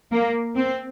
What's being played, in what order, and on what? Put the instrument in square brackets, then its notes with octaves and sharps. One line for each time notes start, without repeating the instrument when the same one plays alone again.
[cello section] A#3
C4